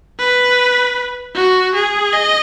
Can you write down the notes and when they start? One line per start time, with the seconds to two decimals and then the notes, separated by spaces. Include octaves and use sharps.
0.19 B4
1.35 F#4
1.74 G#4
2.13 D#5